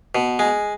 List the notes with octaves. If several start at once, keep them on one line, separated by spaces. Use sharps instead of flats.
B2
G#3